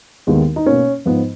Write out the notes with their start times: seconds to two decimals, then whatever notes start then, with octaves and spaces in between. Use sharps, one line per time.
0.27 D#2 D#3 G#3 B3
0.56 D#4
0.66 B2 A#3 C#4
1.06 G#2 F3 B3